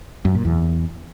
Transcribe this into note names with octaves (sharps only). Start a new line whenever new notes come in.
F#2
A#2
E2